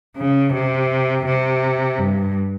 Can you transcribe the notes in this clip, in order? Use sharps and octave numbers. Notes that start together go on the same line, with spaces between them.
C#3
C3
C3
G2